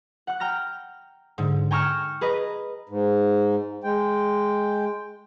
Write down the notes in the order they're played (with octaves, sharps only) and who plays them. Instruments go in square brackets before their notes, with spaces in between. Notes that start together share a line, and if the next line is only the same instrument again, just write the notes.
[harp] F#5 F#6
G5 A#5 F6 A#6
G#2 D3
G5 G#5 A#5 C#6 E6 F6
G#4 B4 D#5 A#5
[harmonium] G#2
G#3 G5